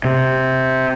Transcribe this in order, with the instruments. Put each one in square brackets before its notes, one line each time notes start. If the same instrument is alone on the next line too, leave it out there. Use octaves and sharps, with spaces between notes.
[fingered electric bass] C3